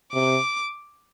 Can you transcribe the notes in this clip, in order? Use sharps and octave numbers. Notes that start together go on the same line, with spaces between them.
C3 D6